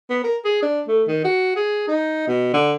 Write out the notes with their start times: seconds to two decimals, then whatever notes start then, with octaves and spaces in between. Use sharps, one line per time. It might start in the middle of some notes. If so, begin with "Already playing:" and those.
0.10 B3
0.24 A#4
0.44 G#4
0.62 D4
0.88 A3
1.08 D#3
1.24 F#4
1.56 G#4
1.87 D#4
2.27 B2
2.54 D3